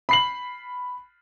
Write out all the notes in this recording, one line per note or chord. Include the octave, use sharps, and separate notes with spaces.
B5 C7 F#7